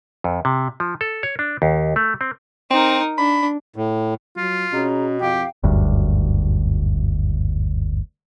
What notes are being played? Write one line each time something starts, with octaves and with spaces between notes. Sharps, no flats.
F2
C3
F3
A4
C#5
D4
D#2
A3
C4
C4 D#4 A#4
D4 B5
A2
F#3 F4
B2 C#4 G#4 A#5
F2 G4 F5 G5
F#1 D2 G2